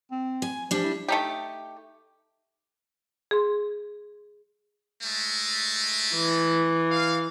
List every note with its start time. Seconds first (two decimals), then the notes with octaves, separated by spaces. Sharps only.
0.12 C4
0.42 G#5
0.71 F3 G3 D4
0.84 E4
1.08 A3 D#4 G4
3.31 G#4 C6
5.04 G#3 A3
6.15 E3
6.91 F5